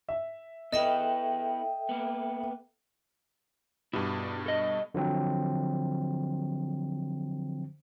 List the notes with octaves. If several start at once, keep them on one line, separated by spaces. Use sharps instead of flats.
E5
B3 E4 A4 B4 D#5 E5 G5
A#3 B3
G2 B2 E4 G4 G#4
A4 D#5
D3 F3 F#3 C4